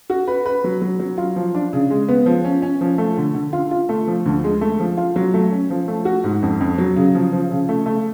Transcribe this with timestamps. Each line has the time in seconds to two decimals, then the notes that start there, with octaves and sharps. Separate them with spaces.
0.10 F#4
0.28 B4
0.46 B4
0.64 F#3
0.82 F#3
1.00 F#3
1.18 F4
1.36 F3
1.55 D4
1.73 C#3
1.91 G#3
2.09 B3
2.26 F3
2.44 C#4
2.62 C#4
2.81 F3
2.98 A3
3.17 D3
3.35 D3
3.53 F4
3.71 F4
3.89 A3
4.07 F3
4.26 D2
4.44 G#3
4.61 A3
4.80 F3
4.97 F4
5.16 F#3
5.34 A3
5.52 C#4
5.70 F3
5.88 A3
6.05 F#4
6.24 G#2
6.43 F2
6.61 F2
6.78 F#3
6.96 C#3
7.15 F3
7.33 F3
7.51 C#3
7.69 A3
7.86 A3